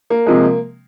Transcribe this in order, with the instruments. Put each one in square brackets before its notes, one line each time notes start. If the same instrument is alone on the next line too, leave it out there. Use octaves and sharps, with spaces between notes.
[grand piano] A#3
C3 F3 G#3